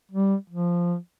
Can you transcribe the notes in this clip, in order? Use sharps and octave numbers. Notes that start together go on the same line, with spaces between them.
G3
F3